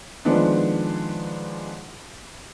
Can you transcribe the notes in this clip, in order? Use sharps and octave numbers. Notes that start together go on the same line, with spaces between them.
D#3 F3 G#3 B3 D4